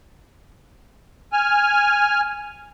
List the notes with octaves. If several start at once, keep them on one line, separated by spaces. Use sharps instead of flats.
G#5 F6